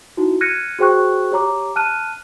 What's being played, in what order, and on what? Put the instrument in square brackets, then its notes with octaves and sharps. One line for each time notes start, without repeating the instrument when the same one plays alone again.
[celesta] D#4 E4 F#4
F6 F#6 G#6 A#6 C#7 D#7
F#4 G#4 C5 G5 C#6 F#6
G4 C#5 A#5 D6
A5 F6 F#6 D#7